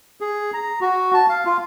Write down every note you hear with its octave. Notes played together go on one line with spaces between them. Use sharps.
G#4
A#5
F#4
A5
F5
F4